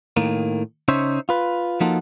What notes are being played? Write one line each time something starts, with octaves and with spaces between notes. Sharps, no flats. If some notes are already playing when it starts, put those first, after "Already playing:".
A2 D#3 A#3
C#3 C#4 D#4 C5 C#5 E5
F4 B4
F3 A#3 D#4 F4 F#4 A4